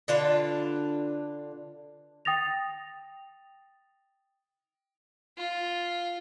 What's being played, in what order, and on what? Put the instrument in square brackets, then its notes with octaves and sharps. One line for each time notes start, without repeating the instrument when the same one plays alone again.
[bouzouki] D3 D4 F4 B4
[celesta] G5 D#6 A6 A#6 F7
[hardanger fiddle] F4